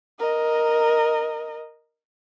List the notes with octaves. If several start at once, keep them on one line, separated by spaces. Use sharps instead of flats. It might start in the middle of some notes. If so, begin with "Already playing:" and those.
A#4 D#5